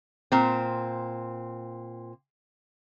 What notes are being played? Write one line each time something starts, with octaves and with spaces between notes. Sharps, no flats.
A#2 C4